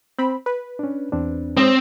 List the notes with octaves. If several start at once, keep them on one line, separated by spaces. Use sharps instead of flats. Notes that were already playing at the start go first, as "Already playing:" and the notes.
C4 B5
B4
C#4 D4
E2 C4 D4
G#2 C4 C5 C#5 D#6